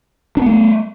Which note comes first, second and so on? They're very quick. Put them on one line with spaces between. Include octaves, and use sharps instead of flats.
D4 B3 A3